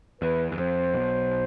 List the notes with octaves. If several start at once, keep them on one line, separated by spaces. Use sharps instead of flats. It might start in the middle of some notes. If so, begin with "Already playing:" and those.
E2 B4
E2
F2 C5
B1 B2